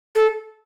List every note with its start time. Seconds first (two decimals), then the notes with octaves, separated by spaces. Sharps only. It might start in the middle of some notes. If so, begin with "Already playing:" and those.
0.15 A4